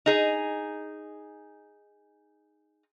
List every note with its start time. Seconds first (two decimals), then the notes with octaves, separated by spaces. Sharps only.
0.06 D#4 G#4